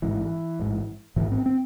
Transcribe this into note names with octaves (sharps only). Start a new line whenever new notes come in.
A1 G#2 E3
A1 G#2
A1 G#2 E3
C4
C4